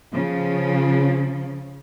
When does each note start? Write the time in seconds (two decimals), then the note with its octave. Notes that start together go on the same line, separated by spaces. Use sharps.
0.14 C#3 F3